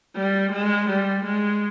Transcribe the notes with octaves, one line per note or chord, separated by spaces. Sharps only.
G3
G#3
G3
G#3